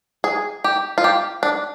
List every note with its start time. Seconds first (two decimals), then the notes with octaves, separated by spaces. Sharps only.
0.24 G#4
0.64 G4
0.98 F4
1.04 G4
1.43 D4